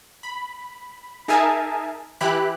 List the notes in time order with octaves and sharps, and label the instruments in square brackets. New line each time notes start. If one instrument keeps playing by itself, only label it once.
[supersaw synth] B5
D#4 G#4 A#4 E5 G#5 A5
E3 E4 G4 B5 F#6